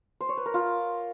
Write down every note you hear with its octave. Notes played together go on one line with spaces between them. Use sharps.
C5
C#5
B4
A#4
F4